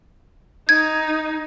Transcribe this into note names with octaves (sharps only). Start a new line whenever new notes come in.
D#4 G#6